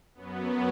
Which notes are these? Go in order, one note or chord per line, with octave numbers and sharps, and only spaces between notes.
F#2 F#3 B3